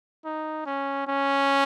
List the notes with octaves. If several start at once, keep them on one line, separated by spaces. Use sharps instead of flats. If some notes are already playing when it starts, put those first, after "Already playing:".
D#4
C#4
C#4